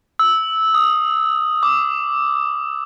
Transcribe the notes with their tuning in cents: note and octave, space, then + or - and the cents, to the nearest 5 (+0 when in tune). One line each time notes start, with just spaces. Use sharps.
E6 -15
D#6 -5
D6 -5